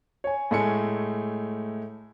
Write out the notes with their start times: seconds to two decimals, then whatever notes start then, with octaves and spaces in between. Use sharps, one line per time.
0.24 C#5 G#5
0.51 A2 G#3 A3 G#5 C#7